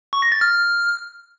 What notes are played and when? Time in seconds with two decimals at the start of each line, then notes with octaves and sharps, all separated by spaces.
0.13 C#6
0.22 A#6
0.32 A6
0.41 F6